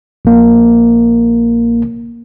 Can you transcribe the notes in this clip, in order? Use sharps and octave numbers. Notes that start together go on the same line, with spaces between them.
A#1 A#3